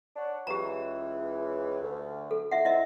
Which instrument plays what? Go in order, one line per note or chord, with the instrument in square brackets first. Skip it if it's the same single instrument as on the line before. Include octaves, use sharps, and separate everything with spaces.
[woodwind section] D4 C#5 F#5
[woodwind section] C#2 E3 [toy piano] G4 A#5
[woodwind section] D2
[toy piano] A4
E4 E5 F#5
[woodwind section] C4 [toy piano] E4 D#5 E5